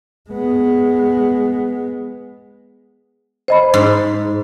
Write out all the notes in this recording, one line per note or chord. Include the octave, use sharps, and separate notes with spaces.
G#3 B3
C5 D#5 B5
G#2